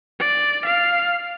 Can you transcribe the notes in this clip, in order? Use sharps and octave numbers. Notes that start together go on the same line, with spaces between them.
D5
F5